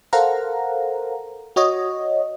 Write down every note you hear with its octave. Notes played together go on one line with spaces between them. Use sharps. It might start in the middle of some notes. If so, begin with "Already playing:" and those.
A4 A#4 C5 F5 F#5 A#5
F#4 C#5 D#5